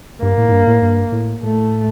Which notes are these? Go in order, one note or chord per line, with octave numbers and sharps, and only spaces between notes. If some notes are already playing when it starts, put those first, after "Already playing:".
G2 A#3
A2
A2
G2
A2
G2
A2
A2 A3